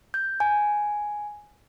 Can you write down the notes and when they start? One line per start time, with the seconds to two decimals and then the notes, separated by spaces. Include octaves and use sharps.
0.14 G6
0.40 G#5